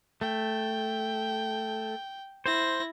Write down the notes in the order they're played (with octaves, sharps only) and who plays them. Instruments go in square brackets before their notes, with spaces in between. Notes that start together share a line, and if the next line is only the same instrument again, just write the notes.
[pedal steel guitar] A3 [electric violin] G5
[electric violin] E4 A#6 [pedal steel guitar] C5